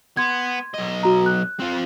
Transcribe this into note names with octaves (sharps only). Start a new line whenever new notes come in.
B3 C6 G#6
B1 D#5
F#4 A#5
F#6
C4 F4